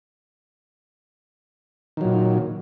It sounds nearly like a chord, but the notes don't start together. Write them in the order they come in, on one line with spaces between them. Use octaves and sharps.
D#3 F#3 A#2